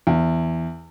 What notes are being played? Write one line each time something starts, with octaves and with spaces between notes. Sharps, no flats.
E2